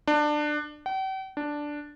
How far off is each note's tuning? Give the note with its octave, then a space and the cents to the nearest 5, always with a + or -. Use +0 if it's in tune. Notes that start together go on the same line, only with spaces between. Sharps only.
D4 +20
G5 -45
D4 +0